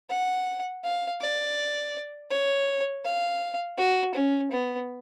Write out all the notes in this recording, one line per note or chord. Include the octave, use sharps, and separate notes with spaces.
F#5
F5
D5
C#5
F5
F#4
C#4
B3